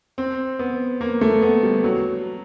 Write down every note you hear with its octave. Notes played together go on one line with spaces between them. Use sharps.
C4
B3
A#3
A3
B3
G3
F#3